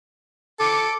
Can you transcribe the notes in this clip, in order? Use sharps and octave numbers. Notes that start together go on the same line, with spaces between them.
A4 D6 C#7